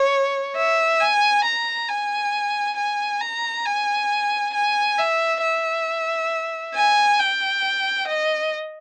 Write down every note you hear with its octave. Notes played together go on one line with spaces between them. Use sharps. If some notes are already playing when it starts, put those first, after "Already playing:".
Already playing: C#5
E5
G#5
A#5
G#5
G#5
A#5
G#5
G#5
E5
E5
G#5
G5
D#5